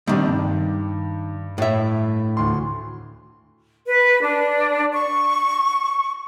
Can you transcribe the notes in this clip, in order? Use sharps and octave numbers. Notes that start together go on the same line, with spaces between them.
C3 D#3 G3 D4
G2
A2 E5
D2 C6
B4
D4
C#6